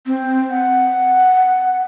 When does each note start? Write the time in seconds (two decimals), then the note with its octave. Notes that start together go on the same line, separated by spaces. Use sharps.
0.06 C4
0.51 F#5